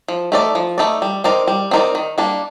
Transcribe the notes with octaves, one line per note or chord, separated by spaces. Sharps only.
F3
A3 D#4 A4 D5
F3
A3 D#4 A4 D5
G3
C4 D#4 A#4 D5
G3
C4 D#4 A#4 D5
D#3
G3 A#3 D4